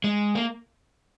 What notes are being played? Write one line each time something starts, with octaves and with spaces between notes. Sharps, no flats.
G#3
A#3